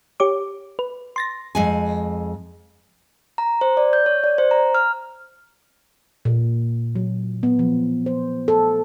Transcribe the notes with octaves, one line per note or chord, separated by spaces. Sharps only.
G4 C#5 D6
B4
C6 A6 A#6
F2 G#3 G#5
A#5
C5
D5
G6
C#5
D5
C5
A#5
F6
A#2
F#3
B3
F3
C5
A4